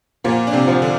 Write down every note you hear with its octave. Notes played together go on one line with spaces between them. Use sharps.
A#2 F3 A#3
D4
C3 C4
F3
D3 D4